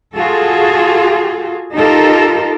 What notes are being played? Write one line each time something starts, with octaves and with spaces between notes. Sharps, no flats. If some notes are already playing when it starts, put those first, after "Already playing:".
F4 F#4 G#4 A4
D#4 F4 G4 A4 A#4